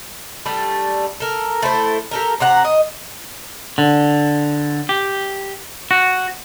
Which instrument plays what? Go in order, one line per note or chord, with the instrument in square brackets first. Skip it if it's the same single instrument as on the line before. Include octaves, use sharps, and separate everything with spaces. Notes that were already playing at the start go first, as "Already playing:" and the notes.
[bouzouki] G3 A3 D4
A4 A#4
A3 E4 C5
G4 A4 A#4
C3 F#4 F#5 A#5
D#5
[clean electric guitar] D3
G4
F#4